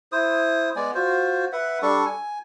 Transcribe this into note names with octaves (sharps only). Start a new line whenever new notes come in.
E4 C5 D#6
G#3 B3 D5 G#5
F4 F#4 C5
B4 E5 F#5
G3 D4 A4 C#6
G#5